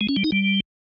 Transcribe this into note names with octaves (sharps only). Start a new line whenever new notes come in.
G#3
C#4
G3
D#4
G3